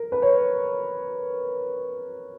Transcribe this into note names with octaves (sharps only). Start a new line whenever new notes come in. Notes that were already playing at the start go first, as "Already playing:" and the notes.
Already playing: A#4
B4
C#5